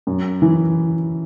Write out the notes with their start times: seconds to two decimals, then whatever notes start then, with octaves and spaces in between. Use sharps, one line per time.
0.07 F#2
0.42 E3